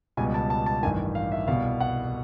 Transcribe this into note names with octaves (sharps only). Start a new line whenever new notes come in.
C#2 B2 G3 G#5
A5
A5
A5
A1 G2 D#3 G#5
F5
E5
C2 B2 G3 F5
F#5